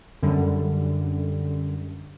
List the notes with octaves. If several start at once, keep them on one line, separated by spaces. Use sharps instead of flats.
F#2 D3 G3